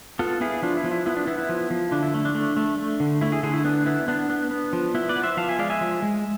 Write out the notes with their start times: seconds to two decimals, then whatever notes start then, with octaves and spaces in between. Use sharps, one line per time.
0.19 B3 F4 A4
0.41 B3 E4 G#4
0.62 F3 D4 F4
0.77 E4
0.84 F3
0.91 E4
1.06 B3 E4
1.16 D4
1.27 B3 E4
1.38 E4
1.49 F3
1.70 F3
1.91 D3 D4
2.03 E4
2.14 A3
2.25 D4
2.35 A3
2.57 A3
2.78 A3
3.00 D3
3.21 A3 E4
3.32 E4 G#4
3.43 D3 E4 G#4
3.54 E4
3.64 B3 D4
3.86 B3 E4
4.08 B3 D4
4.30 B3
4.51 B3
4.73 F3
4.95 B3 E4
5.09 B4 D5
5.16 B3
5.23 C5 E5
5.37 F3 F5 A5
5.49 E5 G#5
5.59 G#3 D5 F5
5.70 E5 G#5
5.81 F3
6.02 G#3